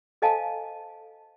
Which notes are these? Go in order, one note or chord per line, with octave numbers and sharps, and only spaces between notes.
A4 C5 D#5 F5 G#5 A5